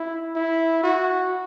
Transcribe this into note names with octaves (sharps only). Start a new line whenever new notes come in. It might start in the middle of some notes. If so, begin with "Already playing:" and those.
Already playing: E4
E4
F#4